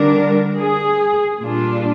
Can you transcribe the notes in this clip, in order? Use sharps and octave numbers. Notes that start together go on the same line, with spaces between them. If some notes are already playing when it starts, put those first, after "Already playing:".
Already playing: D3 G3 D4 A#4
G#4
A#2 G3 D4 F4